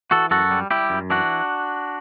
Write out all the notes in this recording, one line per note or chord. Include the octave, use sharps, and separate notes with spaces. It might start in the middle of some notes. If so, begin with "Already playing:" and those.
E3 F#4 A4
F#2 F#4 A4
G3
G3 E4 G4
F#2
E3 D4 F#4